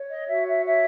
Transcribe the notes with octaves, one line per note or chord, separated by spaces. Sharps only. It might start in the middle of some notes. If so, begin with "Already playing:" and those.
Already playing: C#5
D#5
F#4 E5
E5
C#5 E5